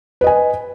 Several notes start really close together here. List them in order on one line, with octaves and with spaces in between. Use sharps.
B4 D#5 G#5